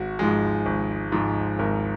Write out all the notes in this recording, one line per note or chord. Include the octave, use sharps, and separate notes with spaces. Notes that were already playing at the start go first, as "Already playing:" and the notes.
Already playing: G#1 F#4
G#2 F3 G#3
G#1
G#2 F3 G#3
G#1 A#4